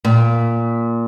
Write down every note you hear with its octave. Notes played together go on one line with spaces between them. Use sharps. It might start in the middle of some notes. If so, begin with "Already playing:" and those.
A#2